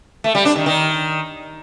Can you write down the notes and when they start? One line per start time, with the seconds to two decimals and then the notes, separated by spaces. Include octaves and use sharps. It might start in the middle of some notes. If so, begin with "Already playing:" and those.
0.24 A3
0.35 G3
0.45 D4
0.56 D#3
0.66 D#3